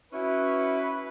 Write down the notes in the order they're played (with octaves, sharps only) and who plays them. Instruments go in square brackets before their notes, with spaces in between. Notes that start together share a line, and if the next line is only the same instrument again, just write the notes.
[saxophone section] C#4 F#4 [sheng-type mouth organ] E4 [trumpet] B4